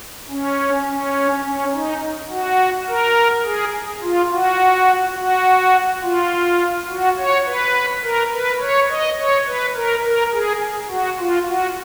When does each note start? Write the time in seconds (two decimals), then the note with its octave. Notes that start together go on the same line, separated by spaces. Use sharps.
0.30 C#4
0.87 C#4
1.44 C#4
1.73 D#4
2.30 F#4
2.88 A#4
3.45 G#4
4.02 F4
4.31 F#4
5.16 F#4
6.03 F4
6.89 F#4
7.18 C#5
7.46 B4
8.03 A#4
8.32 B4
8.60 C#5
8.89 D#5
9.18 C#5
9.46 B4
9.75 A#4
10.03 A#4
10.32 G#4
10.89 F#4
11.18 F4
11.47 F#4